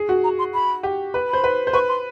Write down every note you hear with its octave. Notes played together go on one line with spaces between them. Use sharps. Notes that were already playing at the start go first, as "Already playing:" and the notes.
Already playing: G#4
F#4
A#5
C6
B5
G4
B4
C5 B5
B4
C5
B4 C#6
C6